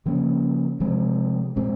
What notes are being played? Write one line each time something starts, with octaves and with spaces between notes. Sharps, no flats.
C#3 F3 A#3 C#4
C3 F3 G#3 C4
A#2 G#3 C4